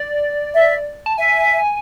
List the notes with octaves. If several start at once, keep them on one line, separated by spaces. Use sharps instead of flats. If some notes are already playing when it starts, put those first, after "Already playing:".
Already playing: D5
E5
A5
E5 G#5